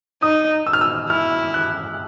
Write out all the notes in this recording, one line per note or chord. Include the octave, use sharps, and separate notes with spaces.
D#4 D#6
E6
F6
E6
E4 F6
F#6